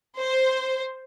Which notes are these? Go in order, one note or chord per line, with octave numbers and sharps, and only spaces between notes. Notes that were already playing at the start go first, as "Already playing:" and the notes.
C5